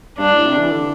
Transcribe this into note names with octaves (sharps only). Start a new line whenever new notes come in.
G2 D4
A2
C3
E3
D3